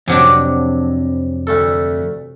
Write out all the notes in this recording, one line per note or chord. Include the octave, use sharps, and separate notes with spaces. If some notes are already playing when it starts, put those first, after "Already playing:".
F2 C3 F#3 D4
D2 A3 A4